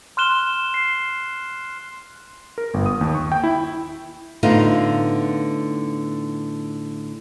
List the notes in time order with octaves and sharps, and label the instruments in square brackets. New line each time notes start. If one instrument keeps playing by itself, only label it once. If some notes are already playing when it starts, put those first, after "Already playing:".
[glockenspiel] C6 F6 F#6 E7 G7
C7
[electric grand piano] A#4
G1
D#6
D#2
C#6
G5
E4
[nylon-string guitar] A2 D3 B3 D#4 F4